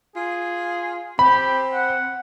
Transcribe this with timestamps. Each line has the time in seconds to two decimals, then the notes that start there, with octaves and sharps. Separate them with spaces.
0.16 F4 G#4
1.19 C4 G4 B5
1.73 F#5